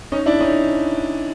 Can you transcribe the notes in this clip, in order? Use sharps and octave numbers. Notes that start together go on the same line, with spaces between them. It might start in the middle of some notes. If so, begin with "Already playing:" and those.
C#4 D#4
D4 E4
C#4 D#4